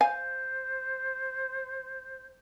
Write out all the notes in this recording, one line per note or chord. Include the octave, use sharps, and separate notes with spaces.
C5 F5 G#5